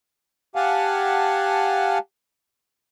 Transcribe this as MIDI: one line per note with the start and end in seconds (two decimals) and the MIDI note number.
0.56 1.98 67
0.56 1.98 77
0.56 1.98 78
0.56 1.98 80
0.56 1.98 81